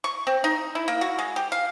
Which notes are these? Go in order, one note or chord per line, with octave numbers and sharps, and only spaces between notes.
C#6
C4
D#4
E4
A#3
F#4
G#3
G4
F5